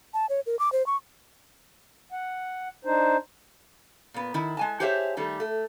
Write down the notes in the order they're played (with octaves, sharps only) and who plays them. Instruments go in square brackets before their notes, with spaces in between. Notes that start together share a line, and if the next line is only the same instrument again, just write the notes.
[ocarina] A5
C#5
A#4
D6
C5
C#6
[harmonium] F#5
D4 D#4 C5
[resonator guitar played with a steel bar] A#2 B3
D#3 E4
G#3 G#5 A5
G4 G#4 C5 C#5 D#5 E5
D#3 G3 A3
A3